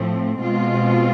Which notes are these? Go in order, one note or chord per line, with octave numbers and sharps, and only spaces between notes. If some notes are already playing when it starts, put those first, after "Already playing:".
Already playing: A2 F3 A3 C4
B2 G#3 C4 F4